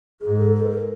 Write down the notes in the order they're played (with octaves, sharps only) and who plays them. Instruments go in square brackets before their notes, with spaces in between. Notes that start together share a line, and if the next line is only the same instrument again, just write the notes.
[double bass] G#2 [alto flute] G#4
[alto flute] A4
A4
B4
A#4